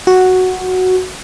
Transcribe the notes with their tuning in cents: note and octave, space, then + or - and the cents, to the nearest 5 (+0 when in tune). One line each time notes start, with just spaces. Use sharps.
F#4 +0